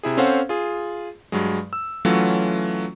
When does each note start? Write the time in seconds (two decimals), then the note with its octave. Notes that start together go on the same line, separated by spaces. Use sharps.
0.03 C3 E4 G#4
0.17 C4 C#4 A4 C5 F5 F#5
0.49 F4 G#4
1.32 G2 F#3 G#3
1.73 E6
2.05 E3 F#3 A3 C#4 F4 F#4